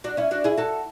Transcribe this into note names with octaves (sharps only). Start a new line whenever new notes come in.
D4 F#4
C#4 E4
D4 F#4
E4 G#4
F#4 A4